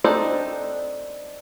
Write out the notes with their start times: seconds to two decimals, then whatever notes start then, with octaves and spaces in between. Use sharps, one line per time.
0.04 C4 D4 D#4 A4 C5